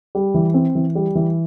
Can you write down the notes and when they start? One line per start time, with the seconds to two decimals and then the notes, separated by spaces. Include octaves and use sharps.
0.15 G3
0.34 E3
0.54 C4
0.75 E3
0.95 G3
1.15 E3